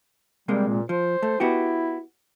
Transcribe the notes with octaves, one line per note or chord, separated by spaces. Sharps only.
C3 G3 G#3 A#3
A#2
F3 C5
A3
B3 E4 F#4 G4